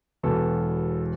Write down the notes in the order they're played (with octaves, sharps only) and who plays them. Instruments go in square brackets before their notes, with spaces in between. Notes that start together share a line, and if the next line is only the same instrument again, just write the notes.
[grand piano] E1 E2 B2 A4